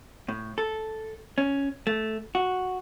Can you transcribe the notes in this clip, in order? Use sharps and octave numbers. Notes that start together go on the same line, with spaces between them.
A2
A4
C#4
A3
F#4